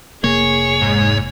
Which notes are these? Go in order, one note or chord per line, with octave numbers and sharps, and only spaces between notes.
F1 C3 A#3 G#4 C#5
G#2